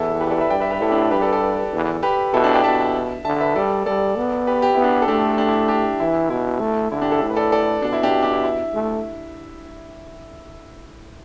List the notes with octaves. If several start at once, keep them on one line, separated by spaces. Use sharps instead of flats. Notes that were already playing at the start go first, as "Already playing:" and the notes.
Already playing: E2 E4 A4
G4 B4
A4 D5
B4 E5
G2 D5 G5
B4 E5
G4 B4
A2 E4 A4
D4 G4
G2 G4 B4
A4 D5
A4 D5
E2
G4 B4
B2 E4 A4
D4 G4
D5 G5
B2 E5 A5
D3 E5 A5
B4 E5
G3 A4 D5
G3 A4 D5
B3
G4 B4
G4
B3 E4
D4 G4
A4
A3 D4 G4
D4 G4
E4
D4 G4
E3 E4
B2 E4
A3
D3 E4
D4 G4
E4 A4
A2
B4
A4 D5
A4 D5
B2 D4
E4
D4 G4
D4 G4
E4
E4
A3